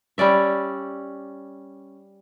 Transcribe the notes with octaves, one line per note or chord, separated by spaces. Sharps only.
G3 C#4 D5 E5